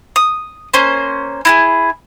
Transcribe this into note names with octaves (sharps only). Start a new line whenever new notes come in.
D#6
A#3 C#4 C5
E4 F#4 G#4